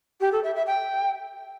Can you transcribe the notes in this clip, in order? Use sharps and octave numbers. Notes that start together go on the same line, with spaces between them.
G4
A4
E5
E5
G5